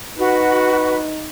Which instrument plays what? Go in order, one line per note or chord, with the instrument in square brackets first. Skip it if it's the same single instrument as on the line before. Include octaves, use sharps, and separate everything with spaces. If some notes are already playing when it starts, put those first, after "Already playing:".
[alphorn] D#4 [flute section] F#4 [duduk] B4